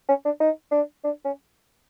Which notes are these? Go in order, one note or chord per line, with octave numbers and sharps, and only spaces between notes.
C#4
D4
D#4
D4
D4
C#4